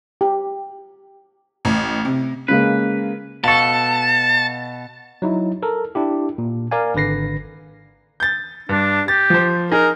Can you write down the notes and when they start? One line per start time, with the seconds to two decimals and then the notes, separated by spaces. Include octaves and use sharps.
0.21 G4
1.65 A1
2.05 C3
2.48 C#3 G#3 A#3 B4
3.44 B2 A4 F5 A5 C#6
5.22 F#3 D#4 E4
5.63 A4 A#4
5.95 D4 E4 G4
6.38 A#2
6.71 A#4 D5 F5 G#5
6.95 G#1 D3 B4 A#6 C7
8.20 G6 A6
8.69 G2 D4
9.08 G4 A6
9.30 F3 C5
9.72 D#4 G#4 A#4